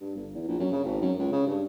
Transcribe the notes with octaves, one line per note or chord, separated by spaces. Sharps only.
G2
G1
E2
A#1
F#2
C#3
G#1
F#2
C#2
C#3
G2